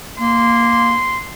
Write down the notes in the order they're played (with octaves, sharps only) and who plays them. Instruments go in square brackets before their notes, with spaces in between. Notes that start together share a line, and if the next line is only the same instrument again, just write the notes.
[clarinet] A#3 [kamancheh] C6